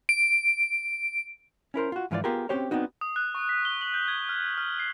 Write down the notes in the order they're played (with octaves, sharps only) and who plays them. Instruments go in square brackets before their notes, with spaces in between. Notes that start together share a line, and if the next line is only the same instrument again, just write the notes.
[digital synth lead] D7
[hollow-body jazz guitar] C#4 E4 A#4 C5
F4 F#4
G#2 E3 F3 F4 G4 D5
B3 F4 G4 G#4 A#4
C4 C#4 F#4 G4 C5 C#5
B3 C4 D4 D#4 F#4
[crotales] D#6
F#6
C#6
B6
G7
F#7
G6
G#6
F6
F6
C7